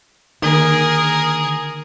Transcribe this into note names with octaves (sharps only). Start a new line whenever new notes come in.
D3 D#3 A#3 G#4 A#4